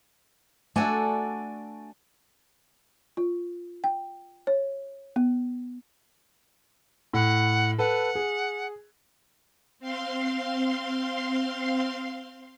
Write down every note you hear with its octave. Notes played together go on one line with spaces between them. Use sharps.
A3 D4 F#4 A4 D5 G#5
F4
G5
C#5
B3
A2 F#5
A4 B4 F#5
G#4
C4 F5 C6